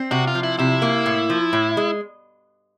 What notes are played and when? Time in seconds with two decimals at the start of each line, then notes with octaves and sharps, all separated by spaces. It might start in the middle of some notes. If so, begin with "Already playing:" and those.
Already playing: C4
0.11 C3 F#4
0.27 F4
0.35 F3
0.43 E4
0.59 C3 E4
0.82 A#3
1.06 A2
1.30 F3
1.53 A2
1.77 G#3